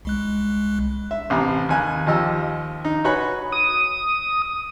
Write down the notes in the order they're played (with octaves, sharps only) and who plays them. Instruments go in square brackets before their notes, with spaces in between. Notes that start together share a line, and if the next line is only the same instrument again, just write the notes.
[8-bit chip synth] C2 G#3 F#6
[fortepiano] E5
A1 C3 B5
D#2 G#5 F#6
D#2 F3 G4 D#5 E6
D#4
F#4 B4 C#5 G#5 B5 F#6
[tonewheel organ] D#6